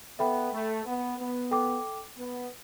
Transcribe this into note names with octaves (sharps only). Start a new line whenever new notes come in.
B3 A4 E5 G5 B5
A3
B3
B3
A4 G5 D6
B3